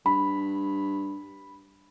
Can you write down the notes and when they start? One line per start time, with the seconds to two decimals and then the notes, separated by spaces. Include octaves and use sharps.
0.06 G2 B5